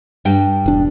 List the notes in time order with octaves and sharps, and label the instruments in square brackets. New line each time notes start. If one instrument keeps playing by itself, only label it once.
[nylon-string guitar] G2 G3 G5
[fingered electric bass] E1 D4